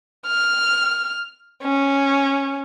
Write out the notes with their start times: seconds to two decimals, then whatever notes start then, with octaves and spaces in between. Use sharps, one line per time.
0.26 F6
1.63 C#4